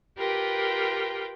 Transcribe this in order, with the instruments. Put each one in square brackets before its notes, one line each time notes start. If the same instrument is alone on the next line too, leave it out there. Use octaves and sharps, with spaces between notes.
[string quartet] F4 G4 A#4 B4 G5